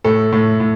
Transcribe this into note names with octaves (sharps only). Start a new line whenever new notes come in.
A2 A4
A2
A2